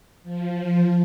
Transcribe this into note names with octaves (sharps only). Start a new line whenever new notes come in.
F3